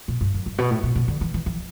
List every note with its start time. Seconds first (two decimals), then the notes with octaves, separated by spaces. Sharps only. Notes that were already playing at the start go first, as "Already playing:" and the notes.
0.08 B2
0.21 G2
0.34 F#2
0.46 G2
0.58 B2
0.71 A2
0.83 B2
0.96 B2
1.08 D3
1.21 E3
1.34 E3
1.46 E3